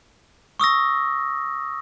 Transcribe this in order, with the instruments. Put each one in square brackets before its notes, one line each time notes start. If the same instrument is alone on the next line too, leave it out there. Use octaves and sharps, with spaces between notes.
[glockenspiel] C#6 D#6 E6 A#6